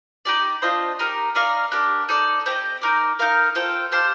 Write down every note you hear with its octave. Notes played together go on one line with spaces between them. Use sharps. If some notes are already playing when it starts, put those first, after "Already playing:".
D#4 G4 D5
D4 F4 C5 D#5
D#4 G4 A#4
D#4 A#4 D5 F5
D4 G4 A#4
D#4 A4 D5
C4 G4 A#4 D#5
D#4 A#4 D5
D#4 A#4 F5
F4 A4 C5 G5
G4 C5 F5 A5